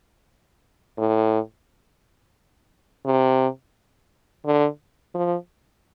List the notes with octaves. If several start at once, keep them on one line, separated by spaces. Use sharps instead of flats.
A2
C3
D3
F3